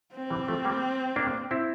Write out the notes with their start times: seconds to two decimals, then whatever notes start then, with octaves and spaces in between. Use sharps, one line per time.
0.13 C4
0.30 E3 G3
0.48 F3 A3
0.65 G3 A#3
1.16 A#3 D4
1.51 C4 E4